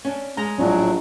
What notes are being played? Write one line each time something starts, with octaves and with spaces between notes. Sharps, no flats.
C#4 D4
G#3 A#5
A#1 A2 F#3 C#4 D4